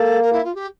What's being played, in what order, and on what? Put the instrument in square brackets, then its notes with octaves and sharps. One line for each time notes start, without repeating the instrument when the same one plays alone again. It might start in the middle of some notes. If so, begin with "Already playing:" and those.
Already playing: [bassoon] A#3 [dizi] A4
[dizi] A#4
E4
F4
G4